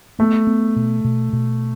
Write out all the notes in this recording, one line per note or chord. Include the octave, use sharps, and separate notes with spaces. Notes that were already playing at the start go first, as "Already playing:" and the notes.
A3 B3
B3
B2
B2
B2